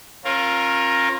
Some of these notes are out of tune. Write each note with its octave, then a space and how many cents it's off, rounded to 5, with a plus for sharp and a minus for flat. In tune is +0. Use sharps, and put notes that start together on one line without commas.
C#4 -40 F4 +0 A#4 +5